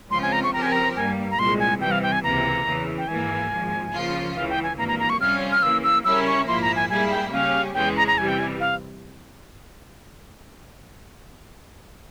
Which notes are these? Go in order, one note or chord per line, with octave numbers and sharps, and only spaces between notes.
C#2 C#3 F3 C4 F4 C6
G#5
A#5
C#6
C#3 F3 C4 G4 A#4 A#5
G#5
A#5
G2 G3 A#3 G#5
A#5
C2 A#2 G#3 C6
G#5
C3 E3 G3 G5
F5
G5
G#5
C#2 C3 E3 A#3 A#5
E2 C#3 E3
G5
G#1 G#2 E3 A#3 G#5
G#1 G#2 F3
C#2 C#3 F3 A#3 F4
C#2 C#3 E3 F5
G5
G#5
G#1 G2 E3 A#3 A#5
A#5
A#5
C#6
F2 C3 G3 C#4 F4 F6
F6
C#3 E3 A#3 E6
E6
C#3 G3 C#4 E4 A#4 E6
C#6
A#1 G#2 F3 A#3 E4 C6
A#5
G#5
G#2 G3 A#3 E4 G#4 G#5
G5
C#3 G3 C#4 G4 F5
E2 C#3 E3 G#3 C#4 G5
A#5
A#5
C3 E3 G3 G#5
G5
G#5
F5